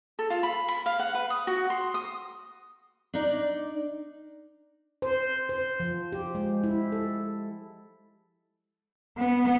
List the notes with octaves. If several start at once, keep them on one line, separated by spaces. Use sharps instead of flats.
A4
F4
B5
B5
F5
F#5
B4
D#6
F#4
C6
D#6
D4 D#4 D5
C5
C5
F3
G4
G#3
E4
A4
B3